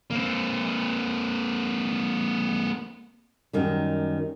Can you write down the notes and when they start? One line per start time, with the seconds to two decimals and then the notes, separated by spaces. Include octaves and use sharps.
0.11 A#3 C4
3.53 F#2 D#3 G3